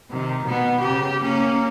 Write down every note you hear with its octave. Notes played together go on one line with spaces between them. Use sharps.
C3 D#3
B2 B3
C#3 G4
A#3 C#4